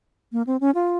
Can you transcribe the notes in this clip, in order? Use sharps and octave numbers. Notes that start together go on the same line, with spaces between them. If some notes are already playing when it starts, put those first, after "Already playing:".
A#3
C4
C#4
F4